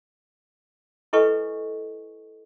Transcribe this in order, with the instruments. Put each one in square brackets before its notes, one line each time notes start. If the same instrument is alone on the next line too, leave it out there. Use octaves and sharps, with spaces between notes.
[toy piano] E4 A4 B4 D#5 G#5 C#6